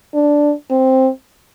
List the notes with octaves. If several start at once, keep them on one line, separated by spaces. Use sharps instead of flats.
D4
C4